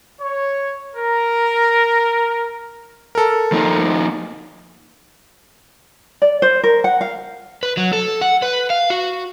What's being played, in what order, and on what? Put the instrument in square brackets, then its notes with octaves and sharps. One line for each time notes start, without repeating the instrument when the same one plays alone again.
[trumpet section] C#5
A#4
[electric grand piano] A4 A#4
[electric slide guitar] F3 A#3 D#4
[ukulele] D5
C5
A#4
F#5
F5
[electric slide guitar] B4
F#3
A4
F#5
B4
F5
F#4